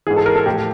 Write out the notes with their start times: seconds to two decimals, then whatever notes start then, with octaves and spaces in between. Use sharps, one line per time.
0.07 G#2 E3 G#4
0.16 A4
0.26 A#4
0.36 A4
0.46 A2 F3 G4